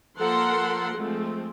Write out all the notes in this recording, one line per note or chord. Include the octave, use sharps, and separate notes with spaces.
F3 A#3 A4 A#4 F#5 C6
F3 G#3 A3 C4